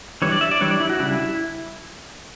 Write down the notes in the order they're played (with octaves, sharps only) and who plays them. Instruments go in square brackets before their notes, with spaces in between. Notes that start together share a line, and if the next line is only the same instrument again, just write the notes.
[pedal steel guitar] E3 G3 D4 C#5
D5
E5
D5
E3 G3 D4 C#5
D5
E4
F#4
C#3 G3 D4 E4